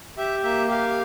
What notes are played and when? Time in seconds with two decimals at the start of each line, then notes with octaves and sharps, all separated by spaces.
0.17 G4 E5
0.44 A#3 E5
0.70 G4 F5